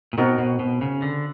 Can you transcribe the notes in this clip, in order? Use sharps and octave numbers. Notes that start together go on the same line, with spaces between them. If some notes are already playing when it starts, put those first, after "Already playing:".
A#2
B2 C4 D#4 F#4 A#4
B2
B2
C#3
D3